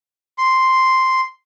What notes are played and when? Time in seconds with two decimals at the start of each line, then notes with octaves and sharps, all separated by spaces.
0.38 C6